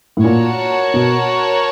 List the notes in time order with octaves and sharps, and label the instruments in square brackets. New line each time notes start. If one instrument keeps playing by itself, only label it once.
[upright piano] A2
[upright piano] A#2 [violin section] F#4 A#4 C#5 F#5 A5
[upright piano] B2